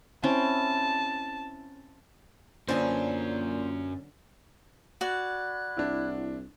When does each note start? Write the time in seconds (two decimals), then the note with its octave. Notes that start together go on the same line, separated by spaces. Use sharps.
0.23 C4 C#4 E4 A5
2.68 F#2 A#2 D3 B3 C#4 C5 G#5
5.01 F#4 D5 B5 F#6 G#6
5.77 C2 D4 E4